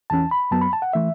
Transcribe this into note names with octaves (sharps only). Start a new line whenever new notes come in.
E2 E3 C#4 A5
B5
F#2 F#3 B3 A5
B5
A5
F#5
E3 A3 E5